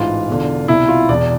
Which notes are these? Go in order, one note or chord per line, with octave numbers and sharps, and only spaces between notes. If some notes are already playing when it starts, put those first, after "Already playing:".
Already playing: A1 G#2 E3 F4
E1 E2 D3
C2 B2 E4
F4
E1 E2 B2 D5